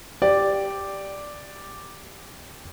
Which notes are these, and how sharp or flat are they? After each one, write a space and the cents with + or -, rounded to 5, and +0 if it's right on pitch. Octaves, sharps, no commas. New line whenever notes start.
G4 +0 D5 +0